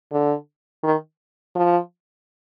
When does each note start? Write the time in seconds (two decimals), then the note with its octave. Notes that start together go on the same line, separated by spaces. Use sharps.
0.12 D3
0.83 D#3
1.55 F3